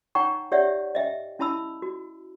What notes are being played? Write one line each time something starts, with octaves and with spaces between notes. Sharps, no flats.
D#4 C#5 F#5 G5 A#5 C#6
G4 C#5 D5 E5 F#5
D#5 E5 G5
C#4 E4 A5 B5 E6
F#4